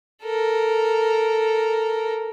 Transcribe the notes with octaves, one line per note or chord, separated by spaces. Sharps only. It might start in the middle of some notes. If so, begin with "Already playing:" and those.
A4 A#4